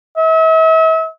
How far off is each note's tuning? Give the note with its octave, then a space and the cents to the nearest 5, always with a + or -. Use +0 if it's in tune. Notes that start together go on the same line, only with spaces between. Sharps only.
E5 -40